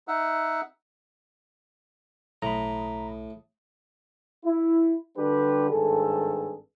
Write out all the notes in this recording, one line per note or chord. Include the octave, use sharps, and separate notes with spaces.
D#4 E5 F#5
B1 A2 A#5 B5 D#6
E4
D3 G3 D4 F#4 G4 B4
G#1 G2 G#4 A4